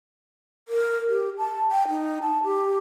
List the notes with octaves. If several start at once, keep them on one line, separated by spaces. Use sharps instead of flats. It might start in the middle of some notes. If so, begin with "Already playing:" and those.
A#4
G4
A5
G5
D#4
A5
G4